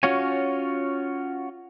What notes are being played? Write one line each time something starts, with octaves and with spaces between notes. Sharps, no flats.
C#4 F4 F#4 C#5 G#5